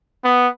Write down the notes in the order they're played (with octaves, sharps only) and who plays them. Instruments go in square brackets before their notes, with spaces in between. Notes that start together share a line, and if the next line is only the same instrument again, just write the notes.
[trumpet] B3